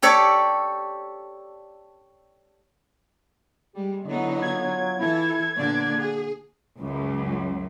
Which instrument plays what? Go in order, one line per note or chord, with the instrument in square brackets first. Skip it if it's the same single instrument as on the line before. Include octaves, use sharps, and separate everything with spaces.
[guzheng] G4 A4 C#5 D5 B5
[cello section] G3 G#3 [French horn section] G4
[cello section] D3 B3 D#4 [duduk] F#3 [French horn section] E4 D#5
[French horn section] F4 [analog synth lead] G#6
[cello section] E3 A4 [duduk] E4
[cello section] A#2 D3 D5 [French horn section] F#3 B3 [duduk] D4
[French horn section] F#4 [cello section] G#4
[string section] C#2 F#2